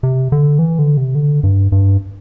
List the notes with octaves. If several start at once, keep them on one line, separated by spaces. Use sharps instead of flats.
C3
D3
E3
D3
C3
D3
G2
G2